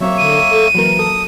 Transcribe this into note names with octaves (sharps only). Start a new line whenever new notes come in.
F#3 A#3 C4 C#5 E5
D3 D#7
A4
E3 F#3 A#3 A#4
A4 D#6